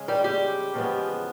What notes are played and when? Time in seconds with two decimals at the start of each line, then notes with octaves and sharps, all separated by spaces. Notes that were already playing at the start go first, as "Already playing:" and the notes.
Already playing: C#3 G#3
0.08 G3 G4
0.24 G3 G4
0.74 E2 C#3 F3 G#3 B3